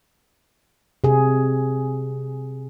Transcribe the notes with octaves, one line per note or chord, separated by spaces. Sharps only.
C3 G#4